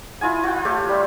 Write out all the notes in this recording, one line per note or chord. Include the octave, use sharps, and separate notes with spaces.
E4 F4 D#5 G#5
F4 G5
A3 G4 A4 C#5
G3